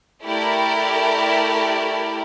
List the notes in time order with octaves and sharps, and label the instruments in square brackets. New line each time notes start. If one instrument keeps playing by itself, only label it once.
[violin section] A3 E4 G4 A#4 D5